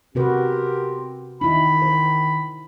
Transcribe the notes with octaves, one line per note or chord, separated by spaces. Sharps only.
C3 C4 F#4 G4 A#4 B4
D#3 D#4 E4 B5
C5